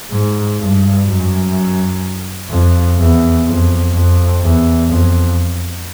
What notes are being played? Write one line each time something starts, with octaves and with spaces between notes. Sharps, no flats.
G#2
G2
F#2
F2
E2
F2
F2
E2
F2